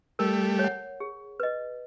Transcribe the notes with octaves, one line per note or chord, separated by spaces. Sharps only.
G3 A3 A#4
C#5
F#5
G#4
B4 D#5